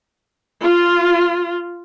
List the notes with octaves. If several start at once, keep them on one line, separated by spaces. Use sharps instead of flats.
F4